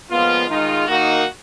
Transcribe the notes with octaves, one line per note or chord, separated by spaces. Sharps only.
A#2 F3 G#3 B3 F4
D#3 G#3 D#4 F4
D#3 A#3 D#4 F#4